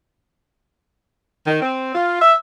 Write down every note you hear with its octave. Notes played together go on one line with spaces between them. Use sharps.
D#3
C4
F4
E5